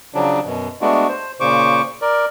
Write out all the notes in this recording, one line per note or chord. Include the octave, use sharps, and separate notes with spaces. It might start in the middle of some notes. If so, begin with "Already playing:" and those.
C#3 F3 F#3 D4
F#2 B2
G#3 A3 B3 D4 F#4
C5
A#2 C#3 C5 C#6 D6
A#4 D5